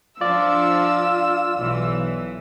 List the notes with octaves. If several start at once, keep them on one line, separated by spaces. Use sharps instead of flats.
F3 D4 F4 D5 E6
B1 E3